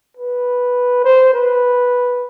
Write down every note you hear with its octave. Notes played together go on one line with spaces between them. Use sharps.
B4
C5
B4